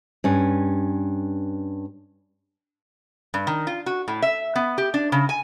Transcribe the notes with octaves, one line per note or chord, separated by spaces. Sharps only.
G2 C#4
G2
D#3
F4
F#4
A2
E5
B3
G4
D4
C#3
G#5